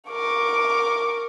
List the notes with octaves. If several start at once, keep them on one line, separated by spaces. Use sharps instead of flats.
A#4 C#6 D6